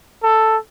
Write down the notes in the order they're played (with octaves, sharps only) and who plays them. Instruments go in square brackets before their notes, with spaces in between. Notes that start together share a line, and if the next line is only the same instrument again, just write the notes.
[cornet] A4